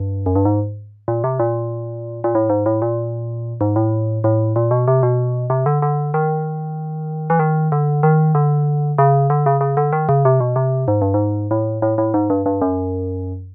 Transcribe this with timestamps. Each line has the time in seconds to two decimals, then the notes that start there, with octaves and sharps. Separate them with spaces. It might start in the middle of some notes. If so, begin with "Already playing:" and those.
Already playing: G2
0.26 F#2
0.36 G2
0.45 G#2
1.08 A#2
1.24 C3
1.39 A#2
2.24 A#2
2.35 A2
2.50 G#2
2.66 A2
2.82 A#2
3.61 G#2
3.76 A2
4.24 A2
4.56 A#2
4.71 B2
4.88 C3
5.03 B2
5.50 C3
5.66 D3
5.82 D3
6.14 D#3
7.30 E3
7.39 D#3
7.72 D3
8.03 D#3
8.35 D3
8.98 C#3
9.30 D3
9.46 C#3
9.61 C#3
9.77 D3
9.93 D#3
10.09 C#3
10.25 C3
10.40 B2
10.56 C3
10.88 G#2
11.02 G2
11.14 G#2
11.51 A2
11.82 A2
11.98 A2
12.14 G#2
12.30 G2
12.46 G2
12.62 F#2